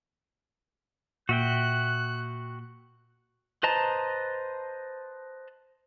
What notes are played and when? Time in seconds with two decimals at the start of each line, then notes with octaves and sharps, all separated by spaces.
1.29 A#2 F#4 E5 G5 F#6
3.63 B4 C5 D#5 A5 A#5